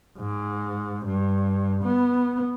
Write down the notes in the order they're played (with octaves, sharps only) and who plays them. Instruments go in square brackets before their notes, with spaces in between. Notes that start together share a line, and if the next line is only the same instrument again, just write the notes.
[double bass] G#2
G2
B3